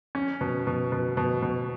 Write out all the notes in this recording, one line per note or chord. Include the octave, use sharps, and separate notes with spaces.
C#4
B2
B2
B2
B2
B2